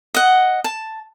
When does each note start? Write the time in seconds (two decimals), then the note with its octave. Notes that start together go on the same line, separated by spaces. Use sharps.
0.14 D#5 F#5
0.64 A5